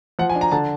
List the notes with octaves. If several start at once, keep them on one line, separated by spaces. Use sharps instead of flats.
F3 F#5
G#5
D4
A#5
D3 A5